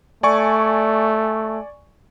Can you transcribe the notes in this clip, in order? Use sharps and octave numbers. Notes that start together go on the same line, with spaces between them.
A3 D5 G#5 C#6